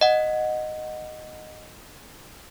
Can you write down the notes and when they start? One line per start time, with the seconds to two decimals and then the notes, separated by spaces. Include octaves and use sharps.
0.01 D#5 F#5